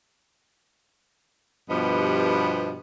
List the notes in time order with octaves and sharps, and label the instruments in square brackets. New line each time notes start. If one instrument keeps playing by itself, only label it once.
[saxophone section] G2 B2 F3 B3 G4 D#5